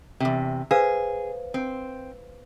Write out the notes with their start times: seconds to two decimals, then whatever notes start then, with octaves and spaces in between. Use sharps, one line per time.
0.20 E2 C3
0.71 G#4 B4 C5 F5
1.54 C4